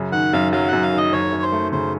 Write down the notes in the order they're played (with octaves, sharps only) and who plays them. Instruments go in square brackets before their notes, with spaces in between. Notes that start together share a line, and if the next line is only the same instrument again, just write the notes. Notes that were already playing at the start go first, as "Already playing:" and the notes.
Already playing: [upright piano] F#2 C#3
[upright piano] D#3 [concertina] F#5
[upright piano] F#2 [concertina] F5
[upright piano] F#3 [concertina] F5
[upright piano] F#2 [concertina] F#5
[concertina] F5
[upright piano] D#3 [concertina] D#5
[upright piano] F#1 [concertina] C#5
[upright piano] F#2
[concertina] C5
[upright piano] A3
[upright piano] C#3 [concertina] C5